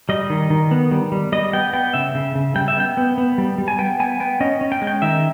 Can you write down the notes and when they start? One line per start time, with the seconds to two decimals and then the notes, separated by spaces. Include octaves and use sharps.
0.09 G3 D#5
0.30 D#3
0.50 D#3
0.71 B3
0.91 G3
1.12 G3
1.32 G3 D#5
1.53 B3 G5
1.73 B3 G5
1.94 C#3 E5
2.15 C#3
2.35 C#3
2.56 G3 G5
2.68 E5
2.76 B3 G5
2.97 B3
3.18 B3
3.38 G3
3.58 G3
3.68 G#5
3.79 B3 G5
4.00 B3 G#5
4.20 B3 G5
4.41 C#4 D#5
4.61 C#4
4.72 G5
4.82 G#3
4.87 G5
5.02 D#3 E5